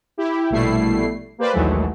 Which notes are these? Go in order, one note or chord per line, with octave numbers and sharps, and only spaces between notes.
E4 G4
A#1 B2 G3 A3 E4 C7
A#3 G4 B4 C5 D5
A#1 D#2 E3 F#3 G#3 A3